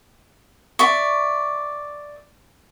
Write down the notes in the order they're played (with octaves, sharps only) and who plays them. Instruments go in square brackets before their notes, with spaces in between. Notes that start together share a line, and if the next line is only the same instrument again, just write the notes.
[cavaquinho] D5 E5 C#6